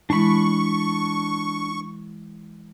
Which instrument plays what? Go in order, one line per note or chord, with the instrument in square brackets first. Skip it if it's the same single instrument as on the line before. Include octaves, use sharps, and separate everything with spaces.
[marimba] E3 G#3 E4 [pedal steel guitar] D4 B5 [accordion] C#6